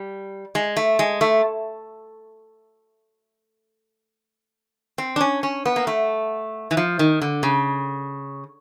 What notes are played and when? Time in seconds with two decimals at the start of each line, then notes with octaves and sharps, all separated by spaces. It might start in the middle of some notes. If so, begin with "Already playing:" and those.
Already playing: G3
0.55 G#3
0.77 A3
0.99 G#3
1.21 A3
4.98 C4
5.16 D4
5.21 C#4
5.43 C#4
5.66 B3
5.76 A#3
5.87 A3
6.71 E3
6.77 F3
6.99 D#3
7.22 D3
7.43 C#3